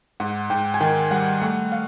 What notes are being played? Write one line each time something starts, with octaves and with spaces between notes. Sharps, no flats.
G#2 F#5
G#2 G5
G#5
D#3 G5
G3 F#5
A3 F#5
F5